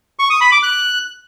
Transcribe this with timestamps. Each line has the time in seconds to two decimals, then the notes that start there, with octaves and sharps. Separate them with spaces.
0.19 C#6
0.30 D#6
0.41 B5
0.52 D6
0.63 F#6